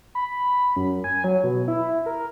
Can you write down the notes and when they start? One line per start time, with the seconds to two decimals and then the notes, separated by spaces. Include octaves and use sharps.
0.15 B5
0.76 F#2
1.04 G#5
1.24 F#3
1.44 B2
1.68 E4
2.06 A#4